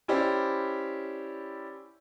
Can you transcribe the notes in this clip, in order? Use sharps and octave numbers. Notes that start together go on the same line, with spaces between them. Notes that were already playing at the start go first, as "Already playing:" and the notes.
C#4 E4 G4 C5 D5